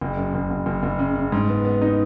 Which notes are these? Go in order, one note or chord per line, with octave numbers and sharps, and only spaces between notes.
F#1
F#2
F#1
F#1
F#1
F#1
C#3
C#3
G#2
B3
B3
D#4